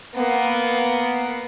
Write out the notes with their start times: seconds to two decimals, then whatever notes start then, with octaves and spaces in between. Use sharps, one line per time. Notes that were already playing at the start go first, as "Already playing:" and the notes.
0.15 A#3 B3